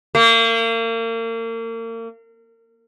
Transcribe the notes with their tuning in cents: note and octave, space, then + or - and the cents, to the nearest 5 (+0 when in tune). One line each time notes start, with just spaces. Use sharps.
A#3 -35